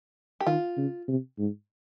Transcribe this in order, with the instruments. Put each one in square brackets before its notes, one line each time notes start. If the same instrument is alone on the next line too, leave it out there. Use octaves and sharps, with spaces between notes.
[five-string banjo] G4
[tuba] D#3 [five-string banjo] F4
[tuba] C#3
C3
G#2